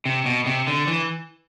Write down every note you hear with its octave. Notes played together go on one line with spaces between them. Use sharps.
C3
B2
C3
D3
E3